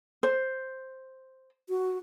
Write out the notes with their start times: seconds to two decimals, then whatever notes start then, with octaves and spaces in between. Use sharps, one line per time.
0.23 C5
1.69 F#4